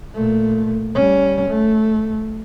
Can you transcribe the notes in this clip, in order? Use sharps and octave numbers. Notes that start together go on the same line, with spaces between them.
A#2 A3
G3 C#4
A3